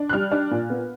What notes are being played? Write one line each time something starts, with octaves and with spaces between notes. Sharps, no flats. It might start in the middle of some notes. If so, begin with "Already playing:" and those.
Already playing: D4
F#6
G3 F6
D4
A#2
B3